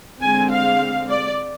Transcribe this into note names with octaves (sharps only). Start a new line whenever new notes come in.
D3 G#3 C4 G#5
F5
D5